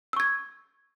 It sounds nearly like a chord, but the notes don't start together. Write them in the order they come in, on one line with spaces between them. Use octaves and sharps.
E6 C#6 G#6